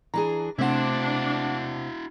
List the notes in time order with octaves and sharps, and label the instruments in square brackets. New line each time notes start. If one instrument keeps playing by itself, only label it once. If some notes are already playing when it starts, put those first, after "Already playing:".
[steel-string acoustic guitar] E3 D4 G#4 [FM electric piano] A#5
[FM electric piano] C3 A3 F#5 [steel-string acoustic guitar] C4 C5 [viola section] D4 [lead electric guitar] E4 F#4